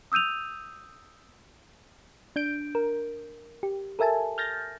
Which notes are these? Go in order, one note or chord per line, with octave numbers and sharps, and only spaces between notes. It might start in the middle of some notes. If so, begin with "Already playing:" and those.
D#6 E6 G6 D#7 F7
D4 G6 D7
A#4
G4
A4 A#4 E5 G#5 A5
F6 G6 A6 A#6